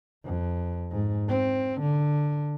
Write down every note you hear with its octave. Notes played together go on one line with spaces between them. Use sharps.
F2
G#2
C4
D3